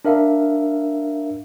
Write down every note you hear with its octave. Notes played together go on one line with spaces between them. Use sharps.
D4 A#4 E5 F5